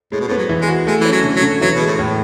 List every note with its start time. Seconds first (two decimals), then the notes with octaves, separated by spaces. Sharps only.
0.12 A2 G#3
0.20 B2
0.28 A2
0.31 B3
0.37 F#3
0.49 E3
0.61 G#3
0.68 F#4
0.87 G#3 A3
1.01 E3 C#4
1.12 F#3
1.24 D3
1.36 F#3
1.42 D3
1.61 E3 F#3
1.75 B2 G#3
1.86 A2
1.99 A2